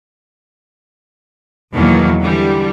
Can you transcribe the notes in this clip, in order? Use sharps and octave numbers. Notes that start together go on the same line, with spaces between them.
E2 B2 D#3 E3 F#3 A#3
D3 E3 G3